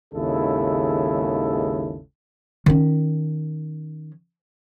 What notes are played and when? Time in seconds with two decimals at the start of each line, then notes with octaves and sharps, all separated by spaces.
0.14 G#1 D#2 C#3 G#3 E4 A4
2.66 D#3 C#4